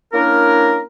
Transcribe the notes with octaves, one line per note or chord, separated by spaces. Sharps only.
A#3 C#4 D4 E4 A#4